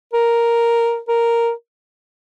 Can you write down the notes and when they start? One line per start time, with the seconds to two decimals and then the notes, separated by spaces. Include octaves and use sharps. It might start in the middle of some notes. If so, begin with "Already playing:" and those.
0.13 A#4
1.08 A#4